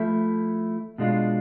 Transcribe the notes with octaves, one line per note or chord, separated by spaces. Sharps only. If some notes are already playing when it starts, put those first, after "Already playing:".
Already playing: F3 A3 E4
B2 G#3 D4 F4